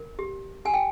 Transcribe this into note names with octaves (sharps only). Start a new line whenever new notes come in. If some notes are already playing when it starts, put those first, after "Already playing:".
Already playing: A#4
G4
G4 G#5
G5